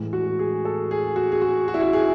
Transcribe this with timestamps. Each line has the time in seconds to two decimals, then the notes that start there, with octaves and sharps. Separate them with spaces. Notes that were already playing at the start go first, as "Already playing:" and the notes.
Already playing: A2 E3 G#3
0.13 F#4
0.39 G#4
0.65 A4
0.91 G#4
1.16 F#4
1.32 G#4
1.41 F#4
1.68 F#4
1.74 E4
1.81 F#4
1.93 G#4